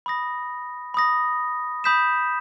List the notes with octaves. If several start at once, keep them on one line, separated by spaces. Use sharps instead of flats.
B5 D#6 A#6
B5 D#6 A#6
B5 D#6 G6 B6 E7